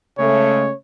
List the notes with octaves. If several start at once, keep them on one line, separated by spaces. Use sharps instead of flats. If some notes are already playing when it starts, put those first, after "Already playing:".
C#3 G#3 A3 C#5